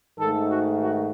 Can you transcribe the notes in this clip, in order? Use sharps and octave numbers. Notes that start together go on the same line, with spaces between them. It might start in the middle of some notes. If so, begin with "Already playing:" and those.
G#2 D#3 A3 A4
F#4
F#4